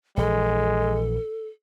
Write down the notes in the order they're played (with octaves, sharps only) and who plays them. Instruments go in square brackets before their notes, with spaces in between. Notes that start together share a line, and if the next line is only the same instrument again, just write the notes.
[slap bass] A#1 E3 [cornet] G#3 [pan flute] A4